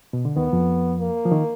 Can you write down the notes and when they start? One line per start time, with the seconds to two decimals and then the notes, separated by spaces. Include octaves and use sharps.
0.13 B2
0.25 D3
0.37 D#2 D#3 B3
0.53 F2 F3
1.00 A#3
1.25 F3
1.32 D#3